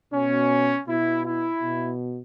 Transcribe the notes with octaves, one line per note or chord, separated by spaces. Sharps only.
B2 C#4
B2 E4
E4
B2